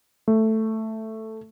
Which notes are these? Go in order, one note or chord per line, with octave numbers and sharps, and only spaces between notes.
A3